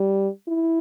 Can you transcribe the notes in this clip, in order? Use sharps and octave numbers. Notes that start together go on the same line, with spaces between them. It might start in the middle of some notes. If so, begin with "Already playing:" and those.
Already playing: G3
E4